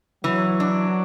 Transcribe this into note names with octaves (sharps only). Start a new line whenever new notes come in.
E3 F#3
D4